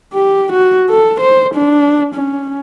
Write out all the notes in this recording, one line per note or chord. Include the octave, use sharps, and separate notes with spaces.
G4
F#4
A4
C5
D4
C#4